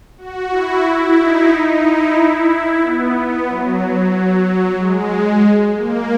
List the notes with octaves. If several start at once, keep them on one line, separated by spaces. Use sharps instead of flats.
F#4
E4
E4
D#4
D#4
E4
E4
B3
B3
F#3
G#3
A#3